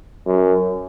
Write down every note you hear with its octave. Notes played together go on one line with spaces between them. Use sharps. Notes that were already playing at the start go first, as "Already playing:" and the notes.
F#2